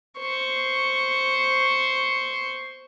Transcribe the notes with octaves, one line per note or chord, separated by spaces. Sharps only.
C5 C#6